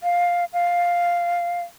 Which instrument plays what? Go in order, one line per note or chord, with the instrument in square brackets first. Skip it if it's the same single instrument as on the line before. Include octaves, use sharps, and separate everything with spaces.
[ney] F5
F5